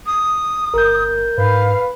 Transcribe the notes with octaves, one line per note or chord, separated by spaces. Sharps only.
D#6
G1 A#4 G6
G#2 B4 F5